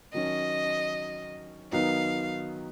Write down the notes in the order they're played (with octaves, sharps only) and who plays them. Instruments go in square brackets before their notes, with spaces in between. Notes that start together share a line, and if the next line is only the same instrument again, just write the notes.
[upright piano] D#3 F#3 C#4 [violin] D#5
[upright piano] D#3 F#3 B3 D#4 [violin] F5